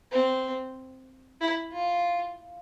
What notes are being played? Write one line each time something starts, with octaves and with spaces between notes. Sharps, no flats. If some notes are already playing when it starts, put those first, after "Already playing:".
C4
E4
F4